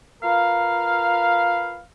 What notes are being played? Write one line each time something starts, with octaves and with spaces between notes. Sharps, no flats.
F4 A#4 B4 F5